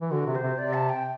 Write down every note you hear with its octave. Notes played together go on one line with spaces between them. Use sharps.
E3
D3 F#4
C3
C5
C3
C3 D5
A5
G5